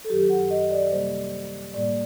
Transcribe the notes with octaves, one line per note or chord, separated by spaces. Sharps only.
A4
F#2 D#3 F#3 G4
F#5
D#5
D5
C3 G3 A#3 C5
A2 G3 A#3 D5